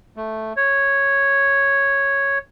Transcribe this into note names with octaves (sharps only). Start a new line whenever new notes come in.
A3
C#5